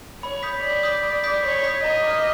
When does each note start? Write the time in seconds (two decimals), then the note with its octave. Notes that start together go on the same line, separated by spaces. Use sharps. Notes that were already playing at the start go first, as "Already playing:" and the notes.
0.23 C#5 B5
0.43 D#6 G6 B6
0.63 D5 B5
0.83 D#6 G6 B6
1.03 B5
1.24 D#6 G6 B6
1.43 C#5 B5
1.64 D#6 G6 B6
1.83 D#5 A#5
2.03 D6 F6